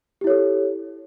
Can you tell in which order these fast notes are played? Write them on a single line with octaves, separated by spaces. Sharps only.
G4 E4 C#5 A4